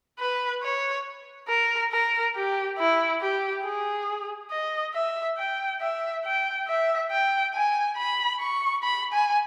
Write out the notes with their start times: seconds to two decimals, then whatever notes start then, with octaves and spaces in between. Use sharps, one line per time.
0.19 B4
0.63 C#5
1.48 A#4
1.91 A#4
2.35 G4
2.78 E4
3.21 G4
3.64 G#4
4.51 D#5
4.94 E5
5.37 G5
5.81 E5
6.24 G5
6.67 E5
7.10 G5
7.54 G#5
7.97 B5
8.40 C#6
8.83 B5
9.12 G#5